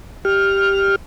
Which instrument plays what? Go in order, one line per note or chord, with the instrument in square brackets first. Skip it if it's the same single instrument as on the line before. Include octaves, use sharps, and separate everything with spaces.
[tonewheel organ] G4 F6